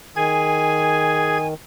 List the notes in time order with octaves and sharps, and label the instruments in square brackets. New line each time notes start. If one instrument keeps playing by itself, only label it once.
[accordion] D#3 [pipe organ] G#4 G#6 [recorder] G#5